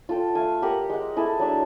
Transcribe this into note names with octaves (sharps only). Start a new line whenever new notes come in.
F4 A4 G5
A3 F5 G#5
G4 A#4 F#5
G#3 F#5
E4 G#4 A4
F#3 D4 E5